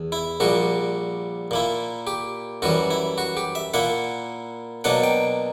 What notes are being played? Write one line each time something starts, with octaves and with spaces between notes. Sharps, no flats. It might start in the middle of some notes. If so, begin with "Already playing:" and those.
Already playing: E2
E4
A#1 A#2 G3 F#4
A#2 A#3 E4
G4
F#2 E3 G3 F#4
E4
F#4
G4
E5
A#2 A#3 E4 F#5
B2 F#3 A#3 D4 F#5
G5